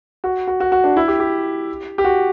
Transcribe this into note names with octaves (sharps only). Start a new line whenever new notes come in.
F#4
F#4
F#4
F#4
D4
E4
G4
G4
G4
F#4